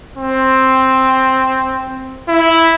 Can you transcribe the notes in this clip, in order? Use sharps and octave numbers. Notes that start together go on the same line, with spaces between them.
C4
E4